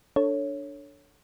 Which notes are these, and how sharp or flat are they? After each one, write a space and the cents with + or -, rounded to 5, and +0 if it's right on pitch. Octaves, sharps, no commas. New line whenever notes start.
D4 +0 A4 +15 C#5 +0